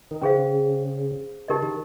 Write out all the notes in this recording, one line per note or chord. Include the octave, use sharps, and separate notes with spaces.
D#3
C#3 C#4 G#4 C5 F5
C#3 D#4 G4 A#4 D#5
D#3